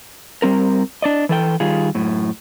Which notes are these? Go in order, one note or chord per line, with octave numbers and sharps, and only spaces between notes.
G3 C4 A#4
D4 D5 D#5
E3 A4 G5
D#3 G3 F4 G#4
F#2 A2